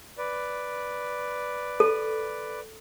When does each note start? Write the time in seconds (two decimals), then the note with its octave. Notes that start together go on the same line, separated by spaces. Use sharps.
0.18 B4 D5
1.80 A4